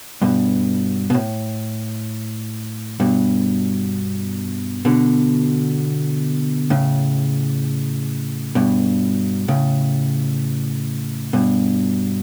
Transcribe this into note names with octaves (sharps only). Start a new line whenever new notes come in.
G2 B2
B2
A2
G2 B2
B2 D3
A2 C#3
G2 B2
A2 C#3
G2 B2